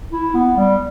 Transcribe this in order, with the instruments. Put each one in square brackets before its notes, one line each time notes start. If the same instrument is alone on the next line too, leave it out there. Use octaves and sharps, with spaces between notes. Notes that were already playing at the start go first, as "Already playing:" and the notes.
[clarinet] E4
B3
G3